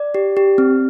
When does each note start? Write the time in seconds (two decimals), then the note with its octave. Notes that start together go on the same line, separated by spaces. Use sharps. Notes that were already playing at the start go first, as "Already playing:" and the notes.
Already playing: D5
0.15 G4
0.37 G4
0.58 C4